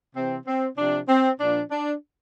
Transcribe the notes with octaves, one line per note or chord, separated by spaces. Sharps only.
C3 E3 C4
C4
C3 F3 D4
C4
A#2 F3 D4
D4